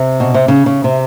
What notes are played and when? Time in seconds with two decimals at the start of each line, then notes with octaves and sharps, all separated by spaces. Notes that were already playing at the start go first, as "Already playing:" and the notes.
Already playing: C3
0.20 B2
0.34 C3
0.48 C#3
0.66 C#3
0.84 C3